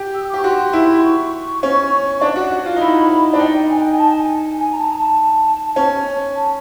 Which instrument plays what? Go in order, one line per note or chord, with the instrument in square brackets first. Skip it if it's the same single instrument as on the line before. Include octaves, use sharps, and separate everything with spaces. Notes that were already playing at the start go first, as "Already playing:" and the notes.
Already playing: [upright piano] G4
[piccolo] E6
D#6
D6
[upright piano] G4 [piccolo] C#6
[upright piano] F#4 [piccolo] C6
[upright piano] E4
[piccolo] C6
C#6
[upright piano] C#4
D4
F#4
F#4
F4
D#4
[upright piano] E4 [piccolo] B5
[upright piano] D4
[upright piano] D#4 [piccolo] G5
[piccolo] G#5
G5
G#5
A5
G#5
G#5
A#5
A5
A#5
A5
[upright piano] C#4
[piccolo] A5